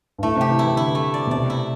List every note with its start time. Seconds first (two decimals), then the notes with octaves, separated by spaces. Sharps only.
0.18 G2
0.22 A2 A3
0.36 C3
0.41 G4
0.50 E3
0.59 E4
0.64 E3
0.77 D3 E4
0.95 A3
1.14 D5
1.27 B2
1.31 C3 D5
1.50 E4